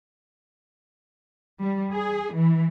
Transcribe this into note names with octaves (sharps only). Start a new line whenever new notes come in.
G3
G#4
E3